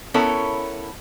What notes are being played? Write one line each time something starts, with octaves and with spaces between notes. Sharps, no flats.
B3 C#4 E4 A4 A#4 C#5